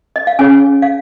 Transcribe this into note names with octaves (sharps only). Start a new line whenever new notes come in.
D#5
F5
C#4 G#4 C#5 G#5
F5